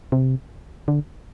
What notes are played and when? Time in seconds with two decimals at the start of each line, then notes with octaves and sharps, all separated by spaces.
0.12 C3
0.88 D3